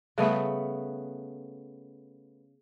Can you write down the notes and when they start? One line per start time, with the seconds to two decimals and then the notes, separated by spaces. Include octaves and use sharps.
0.18 C#3 G3 A3 B3 E5